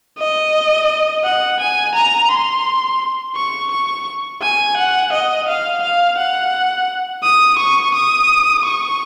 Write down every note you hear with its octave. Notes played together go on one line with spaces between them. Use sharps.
D#5
F#5
G#5
A#5
C6
C#6
C#6
G#5
F#5
D#5
F5
F5
F#5
D#6
C#6
D#6
C#6